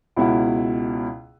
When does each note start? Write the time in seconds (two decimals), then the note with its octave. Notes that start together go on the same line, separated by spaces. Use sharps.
0.17 C#2 B2 E4 F#5